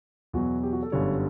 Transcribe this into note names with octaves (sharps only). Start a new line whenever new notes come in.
E2 B2 F#3 F#4
G4
F#4
A4
G1 F#2 D3 G3 C#5